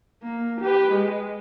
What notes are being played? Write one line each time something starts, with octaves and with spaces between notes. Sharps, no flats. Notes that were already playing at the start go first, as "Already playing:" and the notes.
A#3
G4 B4
G#3